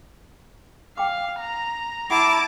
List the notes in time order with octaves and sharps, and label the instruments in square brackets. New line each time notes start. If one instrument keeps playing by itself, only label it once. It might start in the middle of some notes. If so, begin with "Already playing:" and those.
[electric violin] F5 [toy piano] G5 D6
[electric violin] A#5
[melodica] E4 [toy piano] F#5 [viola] A5 D6